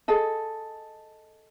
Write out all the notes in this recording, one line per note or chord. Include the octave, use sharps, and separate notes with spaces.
G#4 A4 D#5